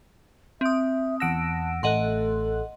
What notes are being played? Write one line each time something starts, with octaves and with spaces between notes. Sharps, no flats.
C4 E5 D#6
E2 F#5 A5 E6 A#6 D7
A1 A3 A4 D#5 F#5 C6 F#6